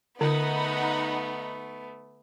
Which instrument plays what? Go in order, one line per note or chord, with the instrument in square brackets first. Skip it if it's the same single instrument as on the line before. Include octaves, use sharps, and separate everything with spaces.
[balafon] D3 [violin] A3 B3 [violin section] D#4 F#5 B5